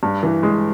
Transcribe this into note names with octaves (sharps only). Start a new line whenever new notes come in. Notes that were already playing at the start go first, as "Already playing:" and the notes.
G2
E3
G#3